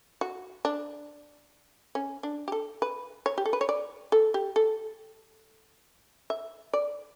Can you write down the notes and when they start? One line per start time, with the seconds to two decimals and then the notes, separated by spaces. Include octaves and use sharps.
0.21 F#4
0.65 D4
1.95 C#4
2.23 D4
2.48 G4
2.52 A4
2.82 B4
3.26 C#5
3.38 G4
3.45 A4
3.53 B4
3.61 C#5
3.69 D5
4.12 A4
4.34 G4
4.56 A4
6.30 E5
6.73 D5